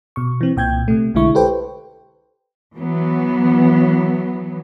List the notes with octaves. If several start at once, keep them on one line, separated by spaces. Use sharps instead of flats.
B2 C#6
E3 C4
C2 A#2 G5 G6 G#6
C3 A3
B1 D3 G#3 E4 C#6
G4 A4 B4 C5 G5
E3 F#3 B3